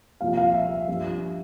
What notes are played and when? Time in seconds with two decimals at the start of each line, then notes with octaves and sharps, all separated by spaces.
0.21 C2 A#2 F3 F5
0.37 F5
0.54 E5
0.88 G2 F3